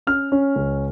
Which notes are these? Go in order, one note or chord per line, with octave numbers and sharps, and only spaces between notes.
C#4 F6
C#4
C#2